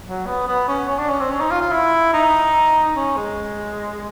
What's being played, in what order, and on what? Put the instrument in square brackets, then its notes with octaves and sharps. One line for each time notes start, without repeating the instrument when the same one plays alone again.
[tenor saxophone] F#3
B3
B3
C#4
C#4
D4
C#4
C4
C#4
D#4
F4
F4
E4
D#4
C#4
G#3